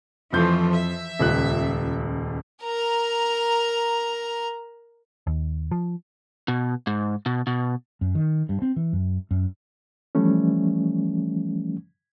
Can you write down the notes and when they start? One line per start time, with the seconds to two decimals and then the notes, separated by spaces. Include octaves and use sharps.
0.33 F2 E3 F3 A3 C6 G6
0.72 E5
1.20 D#1 C#2 F#6
2.63 A#4 A#5
5.27 D#2
5.71 F3
6.48 B2
6.87 G#2
7.26 B2
7.47 B2
8.01 F#2
8.15 D#3
8.49 G2
8.62 C4
8.76 E3
8.93 F#2
9.31 F#2
10.15 E3 F3 G3 A3 C#4